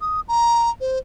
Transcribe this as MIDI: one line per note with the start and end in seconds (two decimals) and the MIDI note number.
0.01 0.21 87
0.28 0.70 82
0.81 0.98 72